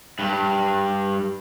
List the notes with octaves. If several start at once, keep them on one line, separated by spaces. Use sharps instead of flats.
G2